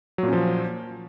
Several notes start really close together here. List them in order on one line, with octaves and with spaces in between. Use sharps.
F#3 A#2 C#4 F3